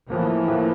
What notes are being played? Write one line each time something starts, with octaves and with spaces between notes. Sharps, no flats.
A2 E3 F3 A#3
A2 F3 A#3